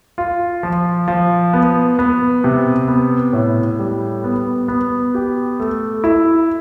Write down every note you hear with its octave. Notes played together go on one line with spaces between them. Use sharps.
F4
F3
F3
B3
B3
C3
B3
A2
G3
B3
B3
G4
A3
E4